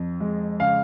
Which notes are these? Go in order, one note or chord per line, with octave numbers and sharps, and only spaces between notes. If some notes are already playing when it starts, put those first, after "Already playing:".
Already playing: F2
G#3
C#3 F5